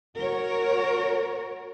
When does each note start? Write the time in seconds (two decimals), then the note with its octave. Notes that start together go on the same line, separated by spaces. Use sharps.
0.17 F#4 A#4 C#5